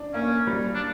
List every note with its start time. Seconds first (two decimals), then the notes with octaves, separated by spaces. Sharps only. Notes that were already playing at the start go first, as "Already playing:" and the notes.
Already playing: D4
0.14 A#3 C#4
0.47 G3
0.75 D4